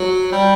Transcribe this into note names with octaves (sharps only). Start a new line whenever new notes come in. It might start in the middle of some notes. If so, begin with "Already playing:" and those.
Already playing: F#3
G3